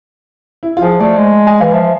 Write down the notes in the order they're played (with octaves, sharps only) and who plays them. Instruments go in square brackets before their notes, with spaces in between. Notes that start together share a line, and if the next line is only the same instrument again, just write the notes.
[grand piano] E4
F4
[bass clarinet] F3 [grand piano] G#4
[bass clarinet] A3 [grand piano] D5
[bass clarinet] G#3
[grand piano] G#5
[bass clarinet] E3 [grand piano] F5
[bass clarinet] F3 [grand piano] E5